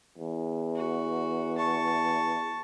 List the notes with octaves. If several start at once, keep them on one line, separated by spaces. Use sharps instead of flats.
E2
F#4
A5 C#6